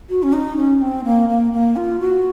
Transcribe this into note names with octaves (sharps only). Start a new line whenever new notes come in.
F#4
C#4
D#4
C#4
C4
A#3
A#3
A#3
F4
F#4